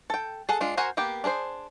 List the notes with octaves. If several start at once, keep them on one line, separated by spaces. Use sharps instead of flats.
A4 G5
G#4 A4 F#5
G#3 D4 F4
F#4 A#4 C5 F#5 G#5
A#3 B3 G4
D4 G#4 A#4 C5